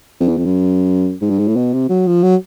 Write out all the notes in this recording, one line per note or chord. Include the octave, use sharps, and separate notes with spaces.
F2
E2
F2
F#2
G#2
G2
G#2
A2
B2
C3
F#3
F3
F#3